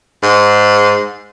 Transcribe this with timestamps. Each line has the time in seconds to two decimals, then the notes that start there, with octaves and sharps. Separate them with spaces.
0.23 G#2